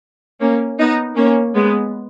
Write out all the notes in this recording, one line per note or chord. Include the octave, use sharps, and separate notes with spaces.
A#3 C#4
B3 D#4
A#3 C#4
G#3 B3